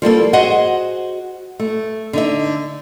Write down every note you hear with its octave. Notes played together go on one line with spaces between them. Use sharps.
F3 G3 A#3 A4
F#4 G#4 C5 D#5 F#5
A3
D3 D#4 E5